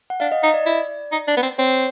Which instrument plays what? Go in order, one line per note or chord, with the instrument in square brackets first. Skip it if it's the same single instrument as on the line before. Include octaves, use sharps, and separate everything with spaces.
[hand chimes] F#5
[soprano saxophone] D4 [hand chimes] F5
[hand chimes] D#5
[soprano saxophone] D#4 [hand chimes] D#5
[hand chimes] D5
[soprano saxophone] E4
D#4
D4
B3
C4
[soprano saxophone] C4 [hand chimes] C#5